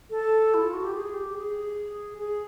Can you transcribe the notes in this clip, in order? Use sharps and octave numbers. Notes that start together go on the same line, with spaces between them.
A4
E4
F4
F#4
G4
G#4
G4
G#4
G#4